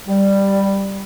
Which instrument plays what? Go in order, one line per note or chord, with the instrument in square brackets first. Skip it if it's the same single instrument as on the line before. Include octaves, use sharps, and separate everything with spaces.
[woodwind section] G3